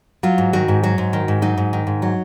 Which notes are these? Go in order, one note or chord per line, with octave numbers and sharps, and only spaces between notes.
F#3 F4
G#2
D#3 F#4
G#2
F#3 F#4
G#2
D#3
G#2
F#3 D#4
G#2
D#3
G#2
F#3